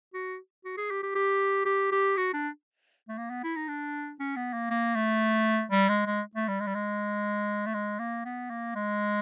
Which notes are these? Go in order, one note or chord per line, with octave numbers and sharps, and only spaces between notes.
F#4
F#4
G#4
G4
G4
G4
G4
G4
F#4
D4
A3
A#3
B3
E4
D#4
D4
C#4
B3
A#3
A#3
A3
G3
G#3
G#3
A3
G3
G#3
G3
G#3
A3
G#3
A#3
B3
A#3
G#3